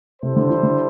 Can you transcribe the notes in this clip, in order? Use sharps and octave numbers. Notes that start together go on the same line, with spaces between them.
C3 G3 E4 A4 C5
D3
E3
D3